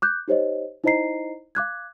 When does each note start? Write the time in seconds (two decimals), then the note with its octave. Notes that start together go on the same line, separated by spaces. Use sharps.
0.02 D6 F#6 G6
0.28 D#4 G4 C5 C#5 D#5
0.84 D#4 E4 C5 D#5 A#5 C7
1.55 F5 D6 F#6 G#6